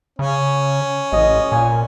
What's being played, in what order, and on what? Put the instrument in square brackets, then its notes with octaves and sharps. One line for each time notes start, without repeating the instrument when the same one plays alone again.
[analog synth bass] C#3 [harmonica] C#4
[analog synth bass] A1 [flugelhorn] D#5
[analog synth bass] A#2 [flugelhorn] G#5